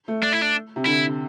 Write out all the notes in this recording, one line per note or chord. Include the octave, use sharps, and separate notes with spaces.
A3
D4
E4
D4
C3
D3 E4